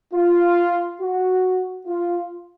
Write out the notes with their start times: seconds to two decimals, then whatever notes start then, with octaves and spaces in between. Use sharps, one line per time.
0.14 F4
1.00 F#4
1.86 F4